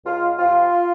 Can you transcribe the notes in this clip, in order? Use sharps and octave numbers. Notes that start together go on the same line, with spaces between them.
C#2 F4
C3 F3 C4 F4